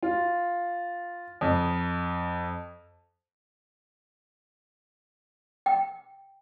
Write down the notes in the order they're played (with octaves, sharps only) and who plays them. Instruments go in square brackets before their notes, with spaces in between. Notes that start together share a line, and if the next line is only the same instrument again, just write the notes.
[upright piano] F4
F2
[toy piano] G5